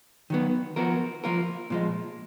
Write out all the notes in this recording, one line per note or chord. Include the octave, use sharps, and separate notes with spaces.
D#3 F#3 B3
F3 B3 F#4 A#4
F3 A#3 F4 A#4
A#2 F3 G#3